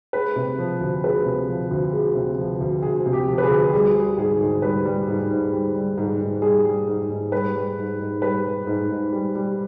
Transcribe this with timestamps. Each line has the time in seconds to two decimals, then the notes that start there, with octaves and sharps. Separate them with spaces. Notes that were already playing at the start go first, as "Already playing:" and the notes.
0.13 G#3 B4
0.36 C3
0.58 F3
0.80 D2
1.04 G#3 B4
1.25 C3
1.49 F3
1.71 D2
1.93 G#3
2.15 C3
2.38 F3
2.61 D2
2.82 G#3 G#4
3.06 C3
3.13 G4
3.28 F3
3.38 B4
3.44 G#4
3.51 D2
3.73 G3 G#4
3.96 G3
4.17 G#2 G#4
4.40 G#2
4.62 G3 B4
4.85 G3
5.08 G#2
5.31 G#2
5.52 G3
5.75 G3
5.98 G#2
6.20 G#2
6.42 G3 G#4
6.65 G3
6.87 G#2
7.09 G#2
7.32 G3 B4
7.54 G3
7.78 G#2
7.99 G#2
8.22 G3 B4
8.45 G3
8.67 G#2
8.90 G#2
9.12 G3
9.35 G3